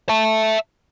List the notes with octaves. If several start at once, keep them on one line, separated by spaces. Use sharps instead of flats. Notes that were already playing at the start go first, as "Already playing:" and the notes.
E5 A5